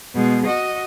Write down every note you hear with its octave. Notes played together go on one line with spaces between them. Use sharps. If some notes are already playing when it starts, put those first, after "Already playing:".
B2 G#3
F#4 D#5